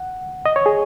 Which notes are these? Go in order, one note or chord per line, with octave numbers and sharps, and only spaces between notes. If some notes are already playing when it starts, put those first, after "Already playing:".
Already playing: F#5
D#5
C#5
G#4